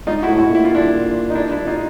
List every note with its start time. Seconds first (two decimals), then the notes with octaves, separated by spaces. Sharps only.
0.07 G#2 D#4 F4
0.23 E4 F#4
0.29 A2
0.39 E4 F#4
0.50 A#2 E4
0.65 F4
0.75 D4 E4
1.30 D#4
1.35 D4 E4
1.51 D4 E4
1.67 D#4 F4